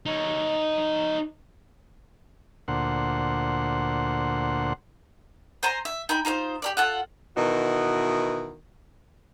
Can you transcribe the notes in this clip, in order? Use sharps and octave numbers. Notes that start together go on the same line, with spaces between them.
D#4 C#5
D2 A#2 C5 F#5
C5 G#5 A#5 C6
E5
D#4 G5 G#5 B5
D#4 F4 B4 C5
G4 A#4 D5
F4 A4 F#5
B2 D#3 E3 D#4 E4 F#4